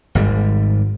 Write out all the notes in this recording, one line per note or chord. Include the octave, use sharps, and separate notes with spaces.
G#1 G#2 G3